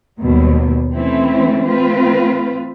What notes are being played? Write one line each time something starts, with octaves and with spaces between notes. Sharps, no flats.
D#2 B2 F#3 G3
E3 A3 C4 C#4 E4
E3 A3 C4 F4 B4